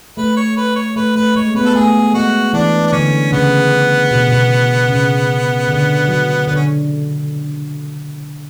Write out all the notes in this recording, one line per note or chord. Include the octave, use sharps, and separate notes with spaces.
A3 B4
C#5
B4
C#5
A3 B4
A3 B4
G#3 C#5
B3 B4
A4
A3 G#4
G#3 F#4
E3 D4
D4
D3 C#4
C#3 B3
B2
B2
C#3
D3
F#3
D3 B3
C#4